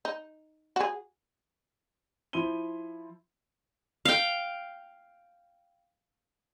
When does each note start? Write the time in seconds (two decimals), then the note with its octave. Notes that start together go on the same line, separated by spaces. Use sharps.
0.05 D#4
0.76 F#4 G#4
2.33 F3 E4 C6 D#7 G7
4.05 F5 G5